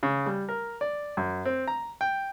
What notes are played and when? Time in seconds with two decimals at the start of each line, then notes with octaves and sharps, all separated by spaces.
0.03 C#3
0.26 G3
0.49 A#4
0.81 D5
1.17 F#2
1.45 C4
1.68 A#5
2.01 G5